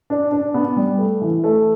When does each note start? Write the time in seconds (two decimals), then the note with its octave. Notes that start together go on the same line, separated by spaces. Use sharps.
0.10 D4
0.31 D4
0.54 B3
0.77 G3
0.99 A3
1.21 E3
1.44 A3